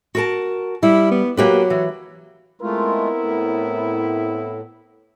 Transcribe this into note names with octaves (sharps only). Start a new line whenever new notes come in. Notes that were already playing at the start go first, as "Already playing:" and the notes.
F#4 A#4 A5
G3 E4
B3
F#3 A#3 G4 B4
E3
G#3 A3 B3 C4 E4 F4 A#4
A2